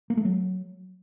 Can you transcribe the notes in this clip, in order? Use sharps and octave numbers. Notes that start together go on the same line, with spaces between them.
A#3
A3
F#3